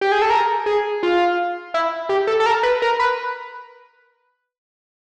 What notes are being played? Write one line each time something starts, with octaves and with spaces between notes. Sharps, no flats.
G4
G#4
A4
A#4
G#4
F4
E4
G4
A4
A4
A#4
B4
A#4
B4